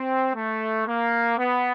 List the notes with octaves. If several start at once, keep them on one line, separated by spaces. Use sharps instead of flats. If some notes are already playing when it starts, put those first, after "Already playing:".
Already playing: C4
A3
A#3
B3